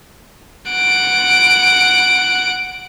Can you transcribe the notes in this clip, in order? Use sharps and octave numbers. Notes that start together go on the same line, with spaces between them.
F#5 D7